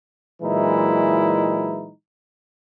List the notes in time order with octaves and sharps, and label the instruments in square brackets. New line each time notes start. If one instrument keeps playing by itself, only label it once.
[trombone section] A#2 E3 F#3 G#3 D#4 E4